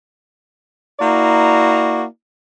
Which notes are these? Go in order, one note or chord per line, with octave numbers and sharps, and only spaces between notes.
A#3 E4 F#4 D5 A#5